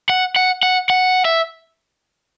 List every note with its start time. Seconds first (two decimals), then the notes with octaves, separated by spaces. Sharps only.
0.10 F#5
0.36 F#5
0.63 F#5
0.90 F#5
1.25 E5